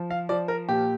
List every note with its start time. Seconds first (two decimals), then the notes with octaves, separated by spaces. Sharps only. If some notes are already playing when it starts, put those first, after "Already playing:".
Already playing: F3
0.11 F5
0.29 F3 D5
0.48 A#4
0.69 A#2 G4